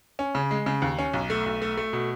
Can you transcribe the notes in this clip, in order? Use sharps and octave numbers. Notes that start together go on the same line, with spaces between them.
C#4
C#3
G#3
C#3
D#2
C#4
B1
A3
B1
A3
A3
B2